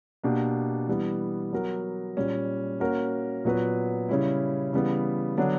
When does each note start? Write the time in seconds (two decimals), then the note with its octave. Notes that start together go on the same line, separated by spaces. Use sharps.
0.23 B2 A#3 D4 G4
0.87 E3 G3 B3
1.53 F#3 B3 F#4 A#4
2.17 A#2 G3 C#4
2.80 A#3 C#4 F#4 A#4
3.45 A#2 F#3 B3 F#4 B4
4.09 C#3 G3 C#4 E4
4.73 C#3 E3 G3 B3
5.37 D3 F#3 B3 D4